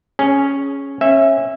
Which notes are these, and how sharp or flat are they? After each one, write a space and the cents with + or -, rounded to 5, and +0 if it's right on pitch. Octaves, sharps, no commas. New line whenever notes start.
C#4 +0 G#4 +0
C#4 -25 E5 +0